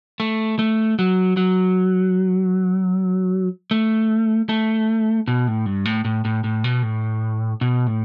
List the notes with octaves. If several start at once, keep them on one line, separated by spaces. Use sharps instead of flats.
A3
A3
F#3
F#3
A3
A3
B2
A2
G2
A2
A2
A2
A2
B2
A2
B2
A2